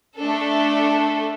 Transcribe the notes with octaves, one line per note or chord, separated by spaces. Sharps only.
A3 D4 A4